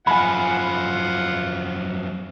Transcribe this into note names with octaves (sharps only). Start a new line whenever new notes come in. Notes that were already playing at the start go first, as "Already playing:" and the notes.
F#2 F3 F4 F#5 G#5 B5